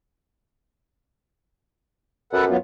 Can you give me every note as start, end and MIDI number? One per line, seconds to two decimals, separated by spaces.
2.33 2.52 42
2.33 2.45 69
2.33 2.45 71
2.33 2.45 78
2.49 2.57 54
2.49 2.57 59
2.49 2.57 65